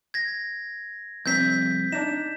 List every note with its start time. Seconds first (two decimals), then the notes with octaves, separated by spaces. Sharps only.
0.14 G#6 A#6
1.26 C2 F2 C4 G6 B6
1.92 D4 D#4 E7